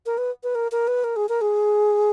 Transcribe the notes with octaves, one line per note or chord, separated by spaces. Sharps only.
A#4
B4
B4
A#4
A#4
B4
A#4
G#4
A#4
G#4